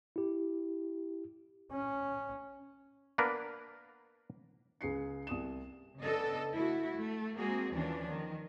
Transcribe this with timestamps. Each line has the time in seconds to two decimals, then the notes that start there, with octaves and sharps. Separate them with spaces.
0.16 E4 G4
1.71 C#4
3.18 A#3 B3 D4 A#4 B4
4.81 C#2 G#4 C7 C#7
5.27 C2 D#6 E7
6.01 C#3 B3 D4 A4 D#5
6.54 A3 E4 F#4
6.96 A3
7.37 G#3 A#3 C4 F#4 G#4
7.72 D#2 E3 F3 C#4 D4
8.10 D#3